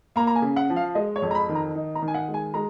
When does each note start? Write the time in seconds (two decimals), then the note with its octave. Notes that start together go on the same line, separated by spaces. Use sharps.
0.16 A#3 A#5
0.27 A#5
0.35 G#5
0.42 C#3
0.56 F#5
0.70 F3
0.76 F5
0.95 G#3 D#5
1.16 C#5
1.22 F2
1.31 A#5
1.35 B5
1.49 D#3
1.55 A#5
1.75 D#4
1.95 A#5
2.02 D#3
2.08 G#5
2.14 F#5
2.28 G#3
2.34 G#5
2.54 G#3 A#5